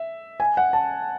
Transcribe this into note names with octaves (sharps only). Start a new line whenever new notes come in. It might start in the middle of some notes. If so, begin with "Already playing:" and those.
Already playing: E5
G#5
F#5
A5